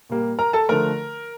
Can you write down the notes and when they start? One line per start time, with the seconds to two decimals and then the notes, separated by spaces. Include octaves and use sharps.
0.09 A#2 G3 A#3
0.39 A#4 A#5
0.53 A4 A5
0.69 D3 F3 A3 A#4 A#5